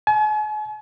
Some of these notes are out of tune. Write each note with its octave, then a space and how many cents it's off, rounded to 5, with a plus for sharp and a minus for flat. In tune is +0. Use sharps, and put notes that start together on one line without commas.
G#5 +45